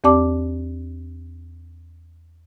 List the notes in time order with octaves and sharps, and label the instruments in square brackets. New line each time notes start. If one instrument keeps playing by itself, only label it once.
[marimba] E2 C4 G4 D5 A5 D6